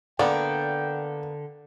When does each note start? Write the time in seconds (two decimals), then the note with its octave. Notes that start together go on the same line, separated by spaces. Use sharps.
0.19 D3 A#3 B3 D5 G5